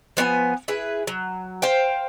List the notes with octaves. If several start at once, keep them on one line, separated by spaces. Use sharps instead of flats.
F3 B3 D5 G#5
E4 G#4 B4
F#3
C5 F5 G5